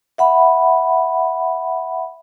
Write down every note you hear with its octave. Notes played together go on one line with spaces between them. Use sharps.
E5 F#5 B5